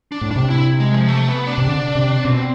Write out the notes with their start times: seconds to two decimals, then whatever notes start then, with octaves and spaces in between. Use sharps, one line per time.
0.12 D4
0.21 A2
0.31 C3 D4
0.50 E4
0.80 G#3
0.94 F3
1.09 A3
1.28 B3
1.47 D4
1.58 C3
1.67 D3
1.95 C3
2.24 B2 C4